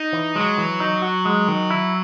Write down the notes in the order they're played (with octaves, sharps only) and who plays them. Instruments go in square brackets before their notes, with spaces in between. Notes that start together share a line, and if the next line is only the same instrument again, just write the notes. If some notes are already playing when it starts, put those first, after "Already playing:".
Already playing: [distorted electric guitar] D#4
[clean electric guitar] E3
[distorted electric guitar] F#3 [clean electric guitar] G#3
[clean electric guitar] E3
D#4
F#4
G#3
D#3
E4